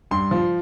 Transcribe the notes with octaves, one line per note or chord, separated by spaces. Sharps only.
G2 C6
F3